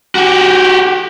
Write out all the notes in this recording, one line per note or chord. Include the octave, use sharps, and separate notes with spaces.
F#4 G4